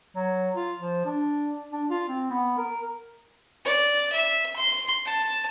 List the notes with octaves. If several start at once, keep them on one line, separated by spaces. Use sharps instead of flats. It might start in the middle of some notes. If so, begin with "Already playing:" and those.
F#3
F4
F3
D4
D4
F4
C4
B3
A#4
D5
E5
C6
A5